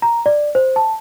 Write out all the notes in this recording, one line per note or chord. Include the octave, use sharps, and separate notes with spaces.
A#5
D5
C5
A5